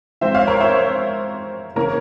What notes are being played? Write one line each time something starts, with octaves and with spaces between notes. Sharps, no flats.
G#2 F3 C4 C5 E5
C#5 F5
A#4 C#5
C5 E5
C#3 E3 A#3 C#4 A#4 C#5